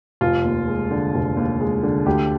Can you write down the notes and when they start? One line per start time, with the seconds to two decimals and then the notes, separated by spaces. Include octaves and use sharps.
0.21 F1 F4
0.44 D#2
0.68 G#3
0.91 D3
1.14 F1
1.37 D#2
1.61 G#3
1.83 D3
2.06 D2 G4